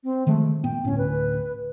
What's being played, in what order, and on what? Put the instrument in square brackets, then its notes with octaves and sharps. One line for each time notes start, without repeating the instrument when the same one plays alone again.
[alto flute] C4
[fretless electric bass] D#3 F3 G#3 [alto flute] A3
[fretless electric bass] A#2 B3 [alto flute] G5
[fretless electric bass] D2 A2 [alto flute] C#4
[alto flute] B4